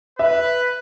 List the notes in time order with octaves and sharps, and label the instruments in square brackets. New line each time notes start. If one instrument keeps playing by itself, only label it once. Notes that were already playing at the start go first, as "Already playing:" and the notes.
[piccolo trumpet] B4 [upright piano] E5